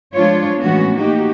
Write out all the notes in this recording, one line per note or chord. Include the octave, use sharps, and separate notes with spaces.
F3 G#3 D4 F4 C#5
A2 E3 G#3 B3 C#4 F#4
A#3 D#4 F#4 G4